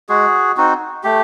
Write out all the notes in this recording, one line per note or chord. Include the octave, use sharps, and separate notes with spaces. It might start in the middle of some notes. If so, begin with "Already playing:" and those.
G#3 F#4 G#4
C4 D#4 F#4
A3 G4